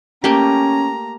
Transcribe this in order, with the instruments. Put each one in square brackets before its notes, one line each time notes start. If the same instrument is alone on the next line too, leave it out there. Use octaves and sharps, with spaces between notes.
[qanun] A3 A#3 G4 [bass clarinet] C#4 [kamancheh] A#5